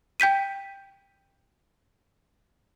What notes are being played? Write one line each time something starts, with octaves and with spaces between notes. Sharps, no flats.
G5 G6 B6 D#7